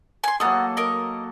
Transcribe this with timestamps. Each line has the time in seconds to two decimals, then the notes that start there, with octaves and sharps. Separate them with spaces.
0.24 G#5 C6
0.40 F#3 A#3 B3 A4 D#5
0.77 A#4 D#5